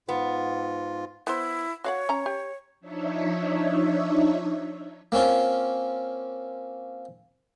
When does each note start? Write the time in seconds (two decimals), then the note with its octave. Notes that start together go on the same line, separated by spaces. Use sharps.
0.09 G#2 B3 F4
1.27 B3 E4 C5
1.84 F#4 C#5 F5 F#5
2.09 C#4 A#5
2.26 G4
2.80 F3 D4 D#4 C#5 E5
5.12 A#3 C4 C#4 F4